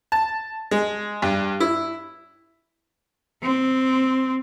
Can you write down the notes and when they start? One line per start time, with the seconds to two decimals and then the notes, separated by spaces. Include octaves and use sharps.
0.12 A5
0.71 G#3
1.22 G2
1.60 E4
3.42 C4